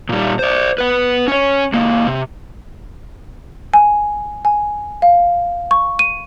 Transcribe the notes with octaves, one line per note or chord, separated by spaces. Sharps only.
A#2 G3
C5 D5
B4 F#5
C#4 C#5
C#2 A#3
C3
G#5
G#5
F5
C#6
D#7